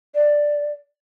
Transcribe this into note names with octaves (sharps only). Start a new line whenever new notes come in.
D5